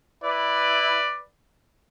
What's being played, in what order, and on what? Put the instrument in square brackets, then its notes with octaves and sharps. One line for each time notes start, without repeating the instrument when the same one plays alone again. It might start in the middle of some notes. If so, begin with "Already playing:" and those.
[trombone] E4 [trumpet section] B4 D5